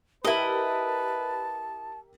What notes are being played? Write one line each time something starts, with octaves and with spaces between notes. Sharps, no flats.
E4 G4 A#4 B4 D#5 E5 A5